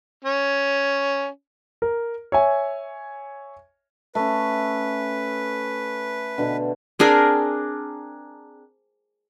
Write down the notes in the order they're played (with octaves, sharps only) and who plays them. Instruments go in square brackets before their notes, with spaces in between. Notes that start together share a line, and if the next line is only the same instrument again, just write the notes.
[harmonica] C#4
[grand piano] A#4
C#5 E5 G#5
[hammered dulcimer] A3 C#4 [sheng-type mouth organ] B4
[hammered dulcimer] B2 D3
[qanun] C4 D4 G#4 A#4